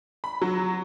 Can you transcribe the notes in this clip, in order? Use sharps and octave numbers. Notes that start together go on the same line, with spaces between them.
B5
F#3